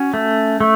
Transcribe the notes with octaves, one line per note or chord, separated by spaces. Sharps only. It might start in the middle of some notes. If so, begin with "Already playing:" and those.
Already playing: C#4 F#4
A3
A3